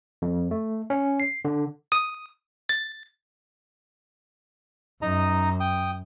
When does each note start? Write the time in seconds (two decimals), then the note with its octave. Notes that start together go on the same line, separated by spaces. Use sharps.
0.22 F2
0.51 A3
0.90 C#4
1.20 C7
1.45 D3
1.92 D#6
2.69 A6
5.02 F#2 D#4 D#5 A#5
5.60 G5 D#6